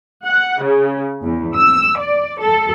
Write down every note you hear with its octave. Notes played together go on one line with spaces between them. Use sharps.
F#5
C#3
E2
E6
D5
A4